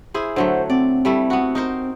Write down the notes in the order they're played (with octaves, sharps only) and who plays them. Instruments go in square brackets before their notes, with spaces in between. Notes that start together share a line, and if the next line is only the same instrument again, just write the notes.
[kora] E4 G#4 C5
[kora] D3 F#3 A3 [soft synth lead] C5
[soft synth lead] C4 [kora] D5
[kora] G3 A3 E4
B3 F#4
D#4 A#4 C5